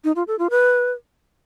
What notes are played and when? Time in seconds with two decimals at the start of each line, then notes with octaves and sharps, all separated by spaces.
0.04 D#4
0.16 F4
0.27 A4
0.39 F4
0.50 B4